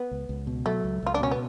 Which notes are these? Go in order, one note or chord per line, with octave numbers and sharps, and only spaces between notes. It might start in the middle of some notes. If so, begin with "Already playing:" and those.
Already playing: B3
C#2
C#2
B2
F#3 A3
C#2
C#2 F4
D4
B2 C#4
B3